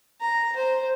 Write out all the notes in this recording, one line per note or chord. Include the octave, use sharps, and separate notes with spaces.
A#5
C5